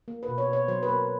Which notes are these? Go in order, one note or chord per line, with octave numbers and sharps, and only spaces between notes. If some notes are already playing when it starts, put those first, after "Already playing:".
A#3
B4
B2
C#5
B2
C#5
F#3 C5
B4
A#3 A#4